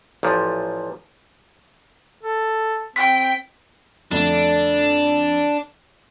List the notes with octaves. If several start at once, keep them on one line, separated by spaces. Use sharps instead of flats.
A1 A#2 F3
A4
C4 G5 B6
F2 D3 A3 D4